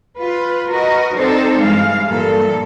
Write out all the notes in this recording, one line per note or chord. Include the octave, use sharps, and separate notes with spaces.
F4 B4
F#4 A#4 B4 D#5
C4 D4 D#4 A4 C5
G2 E3 G#3 F5
G2 A#2 E3 A4